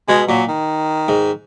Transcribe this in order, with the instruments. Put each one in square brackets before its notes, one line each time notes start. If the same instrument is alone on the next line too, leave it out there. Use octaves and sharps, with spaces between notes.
[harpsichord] B2 [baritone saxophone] G#3
[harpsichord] A#2 [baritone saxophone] F#3
[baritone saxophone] D#3
[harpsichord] G#2